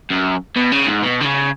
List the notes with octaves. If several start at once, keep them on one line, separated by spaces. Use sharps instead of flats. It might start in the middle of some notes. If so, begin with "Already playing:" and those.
F#2
B2
C#3
G#2
B2
D3
C#3